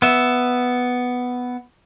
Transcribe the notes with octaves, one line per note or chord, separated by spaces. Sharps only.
B3 E5